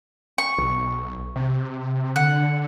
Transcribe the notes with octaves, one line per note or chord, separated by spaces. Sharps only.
C#6
B1
C3
D3 F#5